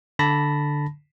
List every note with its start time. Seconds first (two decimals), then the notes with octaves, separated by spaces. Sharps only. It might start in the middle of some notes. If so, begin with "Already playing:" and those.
0.19 D3 A5 B5 A#6